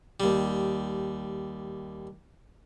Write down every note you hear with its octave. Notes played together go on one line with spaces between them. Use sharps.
D#2 G3